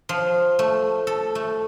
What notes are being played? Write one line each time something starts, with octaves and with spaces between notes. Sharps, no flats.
F3
A3
A4
A3